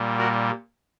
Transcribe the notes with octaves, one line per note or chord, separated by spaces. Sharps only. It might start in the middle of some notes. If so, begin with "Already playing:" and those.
Already playing: A#2 G3
F#4 A#4